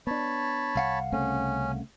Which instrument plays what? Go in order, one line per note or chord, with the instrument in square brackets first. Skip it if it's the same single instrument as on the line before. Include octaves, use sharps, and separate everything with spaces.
[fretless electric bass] B3 D4 [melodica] C#5 A5 B5
[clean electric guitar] C2 F5 F#5
[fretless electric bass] C#3 A3 C4 [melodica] C#4